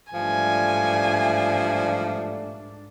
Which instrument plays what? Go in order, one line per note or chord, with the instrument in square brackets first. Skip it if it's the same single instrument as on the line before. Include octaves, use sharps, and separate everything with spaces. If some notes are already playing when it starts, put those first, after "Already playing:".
[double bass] G#2 D4 [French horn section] E3 G3 A3 [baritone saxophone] F3 [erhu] G#5